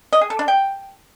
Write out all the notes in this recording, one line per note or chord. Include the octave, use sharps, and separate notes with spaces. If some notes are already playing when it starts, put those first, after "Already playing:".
D#5
G#4
A4
D4
G5